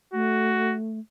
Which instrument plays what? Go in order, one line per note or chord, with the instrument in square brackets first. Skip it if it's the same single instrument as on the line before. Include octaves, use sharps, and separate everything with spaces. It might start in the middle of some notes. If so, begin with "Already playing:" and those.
[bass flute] A3 [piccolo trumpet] F#4